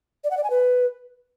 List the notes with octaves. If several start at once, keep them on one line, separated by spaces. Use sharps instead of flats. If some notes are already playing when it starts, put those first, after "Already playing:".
D5
F#5
D5
G#5
B4